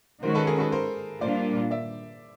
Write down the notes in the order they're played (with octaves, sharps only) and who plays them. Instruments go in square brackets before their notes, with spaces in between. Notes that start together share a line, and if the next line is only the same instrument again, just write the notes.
[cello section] D#3 G#3 C#4 F#4 [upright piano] A#4 C5
[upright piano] A4 B4
G#4 A#4
A4 B4
A#4 C5
[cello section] A#2 G3 A#3 D4 F4 [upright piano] C5 D5
[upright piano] D5 E5